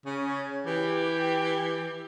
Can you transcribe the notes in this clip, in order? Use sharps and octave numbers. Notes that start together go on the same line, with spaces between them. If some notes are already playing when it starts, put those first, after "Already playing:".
C#3 C#4
E3 G4